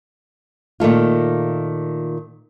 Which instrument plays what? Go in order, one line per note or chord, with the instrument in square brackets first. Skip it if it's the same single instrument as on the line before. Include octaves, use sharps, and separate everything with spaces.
[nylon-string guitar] A#2 D#3 A3 F4